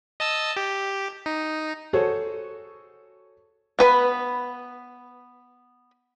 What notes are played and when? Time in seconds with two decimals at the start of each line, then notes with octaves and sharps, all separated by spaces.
0.20 D#5 A5 E6
0.56 G4
1.26 D#4
1.93 F#4 G#4 A4 C5 C#5
3.79 B3 B4 B5